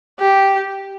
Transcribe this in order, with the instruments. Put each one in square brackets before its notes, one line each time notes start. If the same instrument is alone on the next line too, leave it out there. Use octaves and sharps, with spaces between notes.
[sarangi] G4